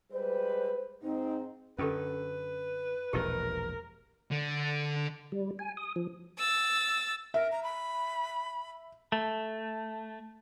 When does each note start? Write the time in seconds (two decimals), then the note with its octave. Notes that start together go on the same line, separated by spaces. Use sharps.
0.11 G3 G#3 B4 C5
1.02 G#2 C4 D#4
1.78 F#2 D3 C#4 G4 A4 B4
3.13 E1 A#1 B2 G4 A#4
4.31 D3
5.32 G3
5.59 G#5
5.77 D#6
5.96 F3
6.39 E6 A6
7.34 A#4 E5
7.51 A#5
7.63 B5
9.12 A3